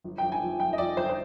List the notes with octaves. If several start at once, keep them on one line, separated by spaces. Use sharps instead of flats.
G1
G5
G1
G#5
F2
G1 G5
D#5
F2 D5
G1 C5
C5